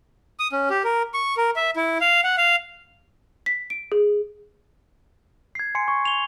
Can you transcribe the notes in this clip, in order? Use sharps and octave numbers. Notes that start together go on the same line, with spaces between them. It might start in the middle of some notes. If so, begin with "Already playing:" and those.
D#6
C#4
G4
A#4
C#6
A#4
E5
E4
F5
F#5
F5
B6
D7
G#4
G#6 C7
G#5 C6 C7 C#7
C#6
F7 G7